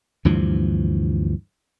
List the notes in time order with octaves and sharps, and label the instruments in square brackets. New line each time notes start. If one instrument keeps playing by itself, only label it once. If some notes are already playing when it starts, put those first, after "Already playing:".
[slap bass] D2 G2 E3 F3